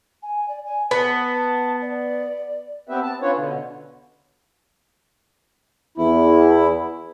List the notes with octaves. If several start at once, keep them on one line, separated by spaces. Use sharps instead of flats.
G#5
D5
G#5
B3 A5
D5
B3 C4 G4 B4 E5
A5
B3 C#4 D4 F4 B4 C#5
B2 D3
E2 E4